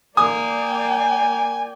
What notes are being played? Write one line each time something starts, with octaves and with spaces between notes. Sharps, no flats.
A#3 D5 G5 G#5 D#6